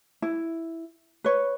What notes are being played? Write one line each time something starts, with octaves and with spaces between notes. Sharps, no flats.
E4
B4 C#5